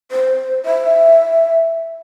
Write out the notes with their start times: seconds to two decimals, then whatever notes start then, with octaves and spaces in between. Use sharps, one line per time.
0.12 C5
0.65 E5